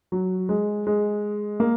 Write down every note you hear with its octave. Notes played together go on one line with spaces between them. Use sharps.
F#3
G#3
G#3
A#3